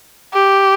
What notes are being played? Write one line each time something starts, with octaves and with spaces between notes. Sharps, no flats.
G4